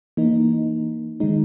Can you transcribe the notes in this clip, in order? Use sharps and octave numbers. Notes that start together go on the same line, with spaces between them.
E3 A#3 D#4
D#3 G#3 D#4